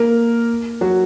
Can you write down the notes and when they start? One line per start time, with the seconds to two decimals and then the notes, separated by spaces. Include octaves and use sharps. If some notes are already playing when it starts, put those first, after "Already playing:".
Already playing: A#3 A#4
0.81 F#3 F#4